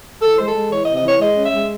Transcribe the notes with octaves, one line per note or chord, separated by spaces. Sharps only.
E3 A4
G#3 C5
A4
G#3
E3 C#5
D#5
C3
D#5
E3 C#5
G#3 D#5
C#4
E5
G#3